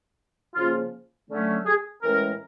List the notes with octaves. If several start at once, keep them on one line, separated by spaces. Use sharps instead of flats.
C#3 F3 A#3 C#4 F4
D3 F#3 A3 C#4
G#4
A2 E3 G#3 C#4 A#4